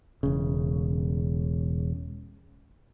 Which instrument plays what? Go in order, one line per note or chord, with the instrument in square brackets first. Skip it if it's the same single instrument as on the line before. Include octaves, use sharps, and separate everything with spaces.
[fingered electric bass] E1 C#3